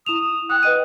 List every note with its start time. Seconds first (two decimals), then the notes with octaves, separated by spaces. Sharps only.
0.06 E4 D#6 E7 F7
0.50 F#5 G5 D#6
0.63 B4 D#5 D#7